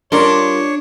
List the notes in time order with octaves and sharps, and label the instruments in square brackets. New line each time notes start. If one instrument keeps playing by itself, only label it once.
[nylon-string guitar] G3 F4 A#4 [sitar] D4 [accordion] C#5 [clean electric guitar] C6